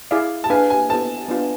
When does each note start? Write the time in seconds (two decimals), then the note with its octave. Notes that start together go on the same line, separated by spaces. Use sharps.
0.11 E4 G#4 D5 F5
0.44 A5
0.50 D4 G#4 B4 F5 G#5
0.70 G#5
0.89 B3 E4 A4 C5 A5
1.28 B3 D4 F4 B4